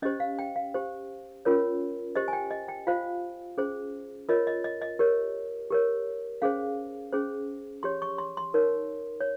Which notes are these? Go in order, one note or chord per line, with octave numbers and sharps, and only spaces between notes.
C#4 G4 C5 D#5
F5
G5
F5
G4 C5
C#4 F4 A#4 C#5
G4 C5 D#5
G#5
G5
D#5
G5
F4 C5 F5
C#4 G#4 C5
F4 A#4 C#5 D#5
D#5
D#5
D#5
G4 A#4 C#5
G4 A#4 C#5
C#4 G#4 C5 F5
C#4 G#4 C5
G4 C#5 C6
C#6
C6
C6
D#4 A#4 C#5
C#5